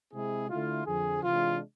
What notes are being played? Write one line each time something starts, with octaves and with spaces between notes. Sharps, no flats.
C3 G#3 C4 E4 G#4
D3 A3 E4 F4
F2 D3 F3 G#4
C3 E3 G#3 D4 F4